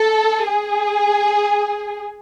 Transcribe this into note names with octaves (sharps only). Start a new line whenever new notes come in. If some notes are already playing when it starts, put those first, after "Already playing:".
Already playing: A4
G#4